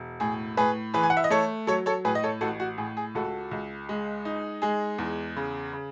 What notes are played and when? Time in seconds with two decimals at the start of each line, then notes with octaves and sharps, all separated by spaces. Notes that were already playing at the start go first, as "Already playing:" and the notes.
Already playing: E1
0.20 A2 G#4
0.57 A2 G#4 B4
0.94 E3 G#4 B4
1.03 G#5
1.10 F#5
1.17 E5
1.24 D#5
1.30 A3 A4 C#5
1.67 F#3 A4 C#5
1.86 A4 C#5
2.05 A2 G#4 B4
2.15 D#5
2.24 A4 C#5
2.41 A1 F#4 A4
2.60 F#4
2.78 A2 G#4
2.97 G#4
3.15 C#2 F#4 A4
3.51 C#2
3.89 G#3
4.25 D#4
4.62 G#3 G#4
4.98 E2
5.36 C#3
5.73 C#3